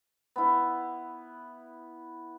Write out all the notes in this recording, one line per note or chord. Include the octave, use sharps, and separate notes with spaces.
B3 E4